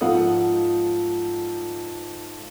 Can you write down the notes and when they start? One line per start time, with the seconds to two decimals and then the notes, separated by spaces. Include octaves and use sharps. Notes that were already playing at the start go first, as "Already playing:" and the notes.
0.01 G#2 F3 A4 F5 F#5 D#6